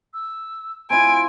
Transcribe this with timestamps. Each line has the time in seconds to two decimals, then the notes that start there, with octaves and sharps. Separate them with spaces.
0.14 E6
0.90 C4 E4 F4 G#5 D7